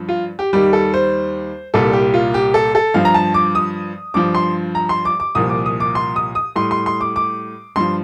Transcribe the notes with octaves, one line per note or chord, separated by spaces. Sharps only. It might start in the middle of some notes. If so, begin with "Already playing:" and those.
Already playing: G2 F3
F4
G4
D#2 D#3 G3 G4
A4
C5
C2 A#2 G3 A4
G4
F4
G4
A4
A4
G2 F3 F5
A#5
A5
D6
D#6
G2 F3 D6
C6
A#5
C6
D6
D6
C2 A#2 F3 D#6
D6
D#6
D6
C6
D#6
D#6
A2 G3 C6
C6
C6
D6
D6
G2 F3 C6